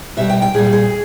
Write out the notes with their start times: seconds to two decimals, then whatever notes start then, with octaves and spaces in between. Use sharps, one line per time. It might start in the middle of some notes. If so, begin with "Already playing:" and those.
0.17 B2 G3 E5
0.30 G5
0.42 G5
0.54 A#2 G3 G#4
0.73 G#4